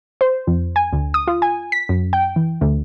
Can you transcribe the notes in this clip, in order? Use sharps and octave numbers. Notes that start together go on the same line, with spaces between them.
C5
F2
G#5
D2
D#6
F4
G#5
B6
F#2
G5
E3
D2